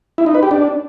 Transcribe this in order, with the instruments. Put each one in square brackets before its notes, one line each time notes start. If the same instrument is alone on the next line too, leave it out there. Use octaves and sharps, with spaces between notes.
[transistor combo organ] E4
D#4
B4
G4
D4